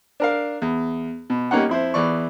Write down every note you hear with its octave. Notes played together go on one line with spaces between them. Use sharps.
D4 A#4 F5
E2
B2
G3 A#3 C#4 D#4 F#5
F2 E4 C5
E2 E3 D5 C#6